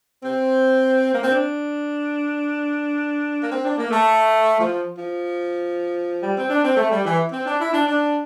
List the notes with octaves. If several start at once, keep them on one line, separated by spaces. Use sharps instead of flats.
C4
A#3
C4
D4
A#3
C4
D4
A#3
A3
F3
F3
G3
C4
D4
C4
A3
G3
E3
C4
D4
E4
D4
D4